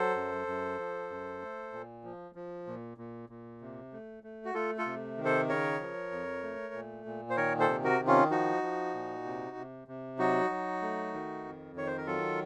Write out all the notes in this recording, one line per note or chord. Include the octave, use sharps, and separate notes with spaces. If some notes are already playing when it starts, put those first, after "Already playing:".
Already playing: F#3 A4 C5
F#2
F#2
F3
F#2
A3
A#2
F3
F3
A#2
A#2
A#2
C3
A3
A3
F#4
A3 F4 A4
F4 A4
C3
D#3
A4 C5
C#3 A#4 C#5
F3
F2
A3
A#2
A#2
C5
D#3 A#4 C#5
A4 C5
C3
F#4 A#4
D#3
C#4 F4
F3 D#4 F#4
F3
A#2
C3
C3
C3
F#3 D#4 F#4
F#3
A3
D#3
F2
D#3 C#5
C5
A#4
F#3 F4 A4